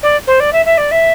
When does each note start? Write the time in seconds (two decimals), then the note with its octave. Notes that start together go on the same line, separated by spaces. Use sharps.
0.02 D5
0.27 C5
0.40 D5
0.52 E5
0.65 E5
0.77 D5
0.91 E5